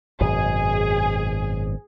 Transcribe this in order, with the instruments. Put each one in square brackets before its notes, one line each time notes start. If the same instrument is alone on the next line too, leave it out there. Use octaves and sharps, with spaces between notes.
[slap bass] G#1 F#2 B2 [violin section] G#4